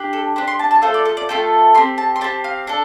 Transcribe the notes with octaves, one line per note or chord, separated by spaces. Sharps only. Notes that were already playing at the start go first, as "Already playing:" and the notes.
Already playing: D4 G4
A4
D4 G4 C5
C6
A5
A5
A3 F4 A4 C5
D5
A4
D5
A3 F4 A4 G5
C4 G4 C6
A5
C6
C4 G4 A5
F5
D4 A4